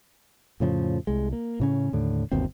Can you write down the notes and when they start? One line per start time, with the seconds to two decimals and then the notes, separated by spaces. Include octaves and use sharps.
0.60 F2 A2 C#3 F3
1.07 C2 G#3
1.33 A#3
1.60 A2 C#3 C#4
1.92 D#2 A2 D3
2.32 G1 D#2 B2 C4